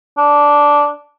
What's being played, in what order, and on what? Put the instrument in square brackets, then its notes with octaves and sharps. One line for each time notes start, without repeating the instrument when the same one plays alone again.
[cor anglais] D4